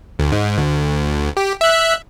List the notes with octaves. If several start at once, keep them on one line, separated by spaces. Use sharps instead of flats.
D2
G#2
D2
G4
E5 F#6